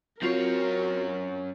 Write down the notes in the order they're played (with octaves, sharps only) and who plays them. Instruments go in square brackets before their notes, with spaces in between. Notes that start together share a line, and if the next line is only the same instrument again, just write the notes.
[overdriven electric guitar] F#2 C#5 [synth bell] C4 F4 [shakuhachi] F#4 [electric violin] A#4